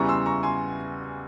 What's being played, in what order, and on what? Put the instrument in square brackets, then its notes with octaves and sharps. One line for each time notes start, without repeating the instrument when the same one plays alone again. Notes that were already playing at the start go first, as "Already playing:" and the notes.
Already playing: [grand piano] E2 C#3 E3 G3 A#5 C#6
C6 E6
A#5 C#6
G#5 C6